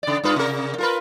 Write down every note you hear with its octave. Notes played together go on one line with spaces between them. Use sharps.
C#3 D5
G2 F4 B4
C3 A#4
F4 A#4 B4